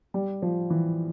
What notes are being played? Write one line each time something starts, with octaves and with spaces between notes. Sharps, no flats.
G3
F3
E3